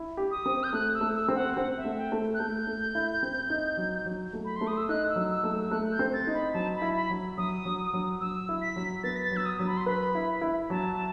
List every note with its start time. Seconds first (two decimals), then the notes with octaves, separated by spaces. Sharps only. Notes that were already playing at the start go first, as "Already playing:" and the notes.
Already playing: E4
0.17 G4
0.31 D#6
0.46 C4
0.64 G6
0.73 A3 F#6
0.94 E6
1.01 A3
1.14 E6
1.28 C4
1.35 F#5
1.57 C4 F#5
1.77 E5
1.85 A3
1.98 G5
2.12 A3
2.34 F#6
2.39 A3 G6
2.67 A3
2.95 E4
3.23 C4
3.50 D#4
3.77 F#3
4.06 F#3
4.33 A3
4.45 B5
4.56 A3 C6
4.67 D#6
4.77 E6
4.89 D#4 F#6
5.10 E6
5.16 F#3
5.30 E6
5.44 A3
5.51 E6
5.71 A3 F#6
5.92 G6
5.99 C4
6.13 A6
6.27 D#4
6.34 B5
6.54 F#3 A5
6.75 B5
6.82 E4
6.96 B5
7.10 F#3
7.37 F#3 D#6
7.65 F#3
7.93 F#3
8.21 F#3 E6
8.49 E4
8.62 B6
8.76 F#3
9.03 B3 A6
9.16 B6
9.24 A6
9.31 F#3
9.37 E6
9.46 D#6
9.59 F#3
9.67 B5
9.77 C6
9.86 B4 B5
10.15 E4
10.41 E4
10.70 F#3 A5